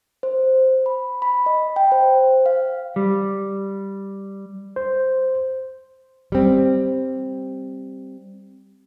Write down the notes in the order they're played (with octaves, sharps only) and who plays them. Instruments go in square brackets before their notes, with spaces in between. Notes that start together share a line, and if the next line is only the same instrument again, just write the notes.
[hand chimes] C5
B5
B5
D#5
G5
C5
F5
[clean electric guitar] G3
[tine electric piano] C5
[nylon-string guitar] G3 C4